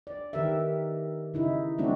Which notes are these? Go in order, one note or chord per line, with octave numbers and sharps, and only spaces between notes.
D5
D#3 G4 A#4 B4 E5
C#3 D#4 E4
F#3 A3 C4 D4 D#4 F#4